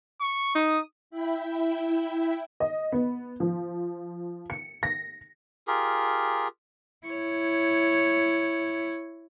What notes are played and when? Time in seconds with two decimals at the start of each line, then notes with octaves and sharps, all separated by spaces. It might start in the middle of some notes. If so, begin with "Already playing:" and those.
0.21 C#6
0.55 D#4 D#6
1.10 E4 E5 G5 B5
2.60 D#5
2.92 B3
3.40 F3
4.50 C#7
4.83 A#6
5.67 F4 G4 G#4 A#4
7.06 E4 C#5